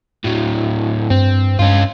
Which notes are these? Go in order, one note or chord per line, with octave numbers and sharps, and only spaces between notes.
A2 F#3
G2 C4
G2 C#4 F4